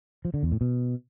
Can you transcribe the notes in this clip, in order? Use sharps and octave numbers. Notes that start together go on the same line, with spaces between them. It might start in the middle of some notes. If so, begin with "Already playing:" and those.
F3
D3
E2
A2
B2